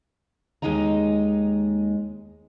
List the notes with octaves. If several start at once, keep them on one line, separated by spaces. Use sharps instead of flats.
D#2 G#2 G#3 D#4 D#5 A#5